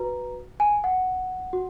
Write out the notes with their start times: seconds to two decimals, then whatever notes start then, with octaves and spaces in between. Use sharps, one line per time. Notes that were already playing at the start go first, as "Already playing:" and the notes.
Already playing: F#4 B4 A#5
0.60 G#5
0.84 F#5
1.53 F#4